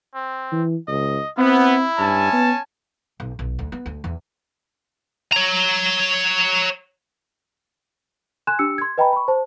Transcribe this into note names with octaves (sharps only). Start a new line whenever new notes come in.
C4
E3
C#2 D#5
B3 C4 E4
G2 C#4 G#5 A5
B3
B1
B1
D2
B3
D2
E2
C#5 A#5
G#5 C6 F#6 G#6 E7
D4 G4 E6 C#7
C6 G#6
B4 D#5 G5 G#5 A#5 B5
B5 C#6
C5 A5